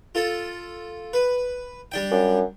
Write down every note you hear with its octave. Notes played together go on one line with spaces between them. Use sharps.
F4 A4
B4
G3 D4 G5
F#2